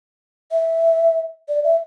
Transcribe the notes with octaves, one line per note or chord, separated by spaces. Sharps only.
E5
D5
E5